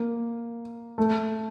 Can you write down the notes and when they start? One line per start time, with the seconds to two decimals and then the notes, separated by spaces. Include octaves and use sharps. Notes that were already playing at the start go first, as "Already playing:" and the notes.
Already playing: A#3
0.98 A3